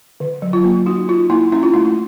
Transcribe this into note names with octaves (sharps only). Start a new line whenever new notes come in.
D3
F#3
F4
A#3
D#4 F#4
D#4 F4
A#3 E4
C#4 E4
F4
A3 E4